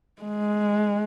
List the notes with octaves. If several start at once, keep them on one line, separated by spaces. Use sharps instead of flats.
G#3